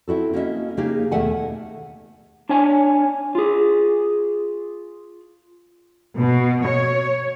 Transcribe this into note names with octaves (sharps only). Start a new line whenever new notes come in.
C4 E4 F#4 A4
A#3 C#4 F#4 A4 D#5 E5
C#3 A#3 D#4 G4 G#4
D#2 B2 A3 E5 F#5 G#5
D4 C#5 G#5
F4 G#4
B2
C#5